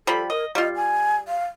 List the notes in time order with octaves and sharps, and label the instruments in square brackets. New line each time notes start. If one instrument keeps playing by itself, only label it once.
[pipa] F3 G3 B5 [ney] A4
[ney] A#4 [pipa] D#5
[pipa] G3 F4 [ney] D#5
[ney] G#5
F5